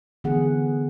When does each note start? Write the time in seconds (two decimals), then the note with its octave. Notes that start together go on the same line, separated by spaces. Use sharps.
0.24 D3 E3 B3 G#4 F#5